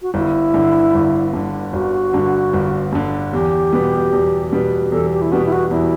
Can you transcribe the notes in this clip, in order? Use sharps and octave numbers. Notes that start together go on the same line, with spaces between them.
F#4
G1 E4
G2 D3
G1
G2 D3
G1 F#4
G2 D3
G1
G2 D3
E2 G4
B2 G3 B3
E2
B2 G3 B3
E2 A4
G4
E4
B2 G3 B3 F#4
E4
F#4
E2 E4